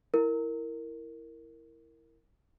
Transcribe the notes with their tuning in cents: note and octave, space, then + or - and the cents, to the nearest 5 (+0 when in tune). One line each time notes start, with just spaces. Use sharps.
E4 +0 A#4 -10